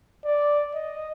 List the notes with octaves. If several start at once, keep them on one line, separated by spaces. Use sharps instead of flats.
D5
D#5